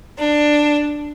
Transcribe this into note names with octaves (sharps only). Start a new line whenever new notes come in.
D4